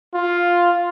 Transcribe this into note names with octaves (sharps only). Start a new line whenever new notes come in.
F4